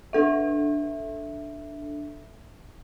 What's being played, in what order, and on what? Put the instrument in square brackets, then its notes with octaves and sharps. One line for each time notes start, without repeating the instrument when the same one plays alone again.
[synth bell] D4 A4 E5